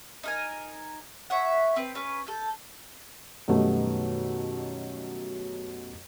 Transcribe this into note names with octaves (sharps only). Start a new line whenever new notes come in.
D#4 A#4 G#5
C#5 E5 F#5
C4 B4
C#4 B4
A4 G6
F#2 B2 D#3 G3 A3 B3